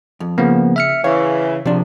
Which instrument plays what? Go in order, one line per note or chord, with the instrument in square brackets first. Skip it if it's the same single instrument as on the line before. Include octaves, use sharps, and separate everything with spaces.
[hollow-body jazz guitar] F2
[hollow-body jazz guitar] C#3 [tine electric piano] F3 A#3 B3
[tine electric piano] E5 F6 C#7
[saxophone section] C#3 E3 [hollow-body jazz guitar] C#5 [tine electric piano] F5
[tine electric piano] C3 [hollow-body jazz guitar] F3 D4